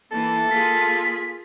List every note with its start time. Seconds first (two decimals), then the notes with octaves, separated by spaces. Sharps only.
0.12 E3 A#3 A4
0.51 A#3 F4 G#4 B6